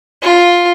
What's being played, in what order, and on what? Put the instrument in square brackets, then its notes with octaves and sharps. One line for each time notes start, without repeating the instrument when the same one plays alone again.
[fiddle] F4